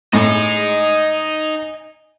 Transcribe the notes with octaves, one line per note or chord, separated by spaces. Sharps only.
A2 D#4 D#5 G#5